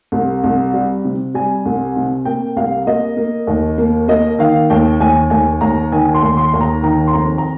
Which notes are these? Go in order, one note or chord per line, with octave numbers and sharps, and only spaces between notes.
C2
C2
G3
C3
G3 G#5
C2
C3
A#3 G5
C2 F5
A#3 D#5
A#3
D#2
A#3
A#3 D#5
D#3 F5
D#2 G5
D#2 G#5
D#2 G#5
D#2 A#5
D#3 G#5
C6
D#2
C6
D#2
A#5
D#3 A#5
C6
F2 A#5
A#5